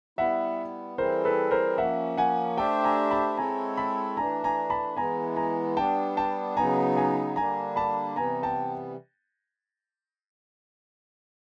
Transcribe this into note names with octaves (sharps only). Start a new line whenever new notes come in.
G3 B3 E4 E5 F#5
E3 G3 C4 E4 G#4 A#4 C5
A4 B4
A#4 C5
F3 A#3 C#4 E5 F#5
F#5 G#5
A3 D4 G4 C5 E5 G5 A5
G#5 A#5
A5 B5
G#3 C4 E4 A4 C#5 G#5 A#5
A5 B5
E3 A3 D4 G#5 A#5
G#5 A#5
A5 B5
E3 G#3 B3 E4 G#5 A#5
G#5 A#5
G3 B3 D4 G5 A5
G5 A5
C#3 F#3 B3 D#4 G#5 A#5
G#5 A#5
D3 G3 A#3 D4 G#5 A#5
A5 B5
C3 E3 G3 B3 G#5 A#5
G5 A5